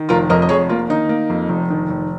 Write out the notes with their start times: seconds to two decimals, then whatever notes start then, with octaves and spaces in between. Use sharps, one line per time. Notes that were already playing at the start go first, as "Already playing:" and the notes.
Already playing: D#3
0.09 F1 F4 A#4
0.30 F2 A#4 D#5
0.42 D#5
0.49 F1 G#4 C#5
0.69 A#3 F4
0.90 D#3 D#4
1.09 A#3
1.30 F2
1.49 F1
1.70 D#3
1.90 F1